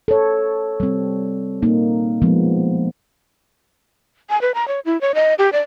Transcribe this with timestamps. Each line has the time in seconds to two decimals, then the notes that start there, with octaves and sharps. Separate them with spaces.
0.08 A4 C#5
0.80 G3 C4
1.62 A#3 D#4
2.22 F3 G#3 B3
4.30 G#5
4.41 B4
4.55 A#5
4.68 C#5
4.85 E4
5.01 C#5
5.15 D#5
5.38 G4
5.53 D5